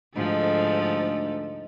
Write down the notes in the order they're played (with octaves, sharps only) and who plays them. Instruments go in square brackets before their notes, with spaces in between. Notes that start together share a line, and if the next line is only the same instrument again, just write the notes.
[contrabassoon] D2 [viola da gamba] G#2 F3 A4 [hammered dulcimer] D#4